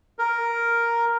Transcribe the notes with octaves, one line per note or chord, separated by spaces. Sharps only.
A#4